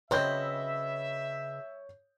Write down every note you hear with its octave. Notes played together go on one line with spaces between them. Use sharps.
C#3 F#3 C4 B4 C#5 D#5 E5 G6